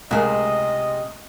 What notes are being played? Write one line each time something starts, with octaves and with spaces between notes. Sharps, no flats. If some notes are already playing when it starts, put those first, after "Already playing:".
C#2 C3 G#3 A3 G#4 A#4 D#5